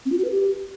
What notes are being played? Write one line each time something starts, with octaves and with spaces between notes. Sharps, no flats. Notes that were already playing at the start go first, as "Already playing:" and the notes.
C4
F4
F#4
B4
G4